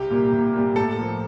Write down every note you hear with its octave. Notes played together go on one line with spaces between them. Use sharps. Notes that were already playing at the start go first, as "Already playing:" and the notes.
Already playing: C2 G4
A#2 G3 A#3
C2
A#2 G3 A#3
A2 A4
F3 A#3